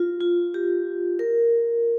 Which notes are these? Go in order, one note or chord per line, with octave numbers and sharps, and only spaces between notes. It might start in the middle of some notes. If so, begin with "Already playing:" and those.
Already playing: F4
F4
G4
A#4